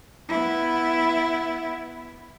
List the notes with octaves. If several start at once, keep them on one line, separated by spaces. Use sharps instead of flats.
B3 E4